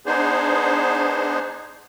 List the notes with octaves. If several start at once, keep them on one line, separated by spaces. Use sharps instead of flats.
B3 D4 D#4 G#4 C5